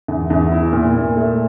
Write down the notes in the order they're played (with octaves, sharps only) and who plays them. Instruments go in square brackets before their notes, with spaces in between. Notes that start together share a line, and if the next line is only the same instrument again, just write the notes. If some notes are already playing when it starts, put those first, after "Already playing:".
[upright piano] E2
E2
E4
A#2
A#2
A3